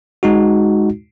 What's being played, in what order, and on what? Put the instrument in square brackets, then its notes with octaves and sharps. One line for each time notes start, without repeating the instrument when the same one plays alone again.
[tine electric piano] G#3 D#4 F#4